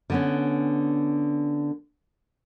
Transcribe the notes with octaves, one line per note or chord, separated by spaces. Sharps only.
D3 B3 C#4